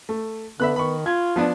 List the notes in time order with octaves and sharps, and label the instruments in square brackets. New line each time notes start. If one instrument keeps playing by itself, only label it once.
[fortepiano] A3
[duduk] D3 [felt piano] B3 [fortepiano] E5 B5 F#6
[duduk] D#3 [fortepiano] B5 C#6
[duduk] F4 [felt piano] G#6
[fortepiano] F3 B3 D4